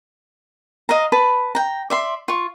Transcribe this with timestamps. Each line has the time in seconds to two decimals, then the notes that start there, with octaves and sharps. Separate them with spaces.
0.89 D#5 F5 A#5
1.12 B4 A5 B5
1.55 G5 A#5
1.90 D5 E5 C6
2.28 F4 C#6